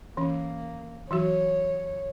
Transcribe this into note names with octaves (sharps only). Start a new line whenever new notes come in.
E3 A#3 C#4
E3 F#3 F#4 C#5